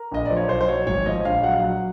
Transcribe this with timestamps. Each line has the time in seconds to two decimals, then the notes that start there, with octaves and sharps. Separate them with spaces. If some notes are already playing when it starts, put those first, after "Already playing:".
Already playing: A#4
0.11 A#1 D#5
0.26 F3 D5
0.37 C#5
0.48 B1 C5
0.61 C5
0.68 F#3 C#5
0.87 G#1 C#5
1.06 F3 D#5
1.25 A#1 F5
1.43 F#3 F#5
1.51 F5
1.60 F#3 F#5